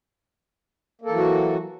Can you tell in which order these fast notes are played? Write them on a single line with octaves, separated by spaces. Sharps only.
A#3 A4 E3 F#3 F#4